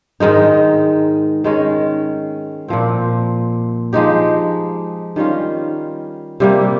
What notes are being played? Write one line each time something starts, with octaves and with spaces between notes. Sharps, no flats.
G#2 D#3 G#3 D#4
D#3 G#3 C#4
A#2 F3 C4
F3 G#3 D#4 G4
D#3 G3 C#4 F4
C3 G3 A#3